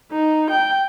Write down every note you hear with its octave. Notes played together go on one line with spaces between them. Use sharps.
D#4
G5